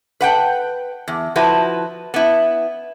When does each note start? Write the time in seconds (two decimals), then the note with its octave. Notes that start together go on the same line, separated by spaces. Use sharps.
0.21 B4 F#5 G5
1.08 E2
1.36 F3 E4 F#4 B4
2.14 B3 E4